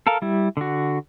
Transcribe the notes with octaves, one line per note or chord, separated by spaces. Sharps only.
A4 A#4 F5
G3 E4
D3 F#4